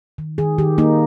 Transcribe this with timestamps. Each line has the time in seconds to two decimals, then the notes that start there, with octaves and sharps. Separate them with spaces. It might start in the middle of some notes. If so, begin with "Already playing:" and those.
0.18 D#3
0.38 D#3 G#4
0.58 D#3 G4
0.78 A#3 D#4